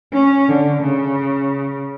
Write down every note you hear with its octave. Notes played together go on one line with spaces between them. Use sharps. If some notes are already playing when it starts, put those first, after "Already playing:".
C#4
D3
C#3